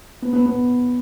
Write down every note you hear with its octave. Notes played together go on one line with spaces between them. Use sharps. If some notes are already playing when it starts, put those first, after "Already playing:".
B3
B3
B3